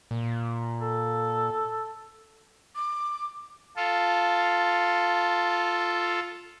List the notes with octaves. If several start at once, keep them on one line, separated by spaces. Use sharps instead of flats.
A#2
A4
D6
F4 A4